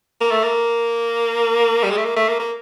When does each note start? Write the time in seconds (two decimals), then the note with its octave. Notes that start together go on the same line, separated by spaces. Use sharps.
0.21 A#3
0.31 A3
0.44 A#3
1.84 G3
1.91 G#3
1.97 A3
2.05 A#3
2.17 A3
2.29 A#3
2.40 A#3